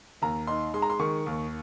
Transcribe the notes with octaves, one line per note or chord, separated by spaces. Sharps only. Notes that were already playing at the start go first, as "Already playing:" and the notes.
D#2 A#5
D#4 C6
G#3 C6
A#5
C6
D#3 C#6
D#2